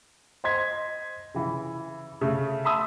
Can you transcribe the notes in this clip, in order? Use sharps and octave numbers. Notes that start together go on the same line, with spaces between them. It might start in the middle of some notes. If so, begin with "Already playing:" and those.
C5 D#5 C6 G#6 B6
C#3 E3
C#3 A3
E5 A5 B5 C6 D#6 E6